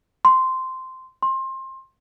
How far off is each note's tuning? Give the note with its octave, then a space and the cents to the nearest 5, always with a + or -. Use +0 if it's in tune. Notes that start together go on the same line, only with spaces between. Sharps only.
C6 -10
C6 +25